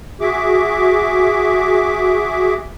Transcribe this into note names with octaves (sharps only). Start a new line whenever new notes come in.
F#4 G#4 E5 D6